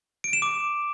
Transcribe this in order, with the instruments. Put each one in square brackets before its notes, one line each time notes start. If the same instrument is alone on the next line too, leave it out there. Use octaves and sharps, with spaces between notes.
[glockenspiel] D7
E7
D6